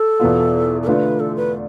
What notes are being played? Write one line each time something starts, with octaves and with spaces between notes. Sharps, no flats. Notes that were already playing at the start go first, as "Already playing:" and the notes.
Already playing: A4
E2 B2 B3 F4
A4
D3 A3 D4 F4 B4
A4
B4